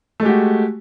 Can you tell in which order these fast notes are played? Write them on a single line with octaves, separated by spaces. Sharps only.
A3 G#3 G4 F#4